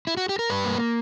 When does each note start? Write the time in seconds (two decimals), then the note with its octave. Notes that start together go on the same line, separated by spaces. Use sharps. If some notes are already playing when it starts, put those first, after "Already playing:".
0.07 E4
0.17 F#4
0.29 G4
0.39 A#4
0.50 G2 B4
0.64 A#3